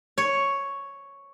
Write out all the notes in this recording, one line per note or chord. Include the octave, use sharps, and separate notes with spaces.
C#5